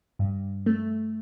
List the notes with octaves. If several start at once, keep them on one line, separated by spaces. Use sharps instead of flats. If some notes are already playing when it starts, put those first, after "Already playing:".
G2
A3